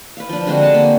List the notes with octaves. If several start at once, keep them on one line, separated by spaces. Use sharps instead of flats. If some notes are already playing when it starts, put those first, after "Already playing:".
B4 F5
F3 D4
D3 G#3 C4 F#4
G#4 F#5 A5
A#3